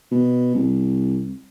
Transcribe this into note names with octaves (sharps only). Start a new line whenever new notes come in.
B2
C2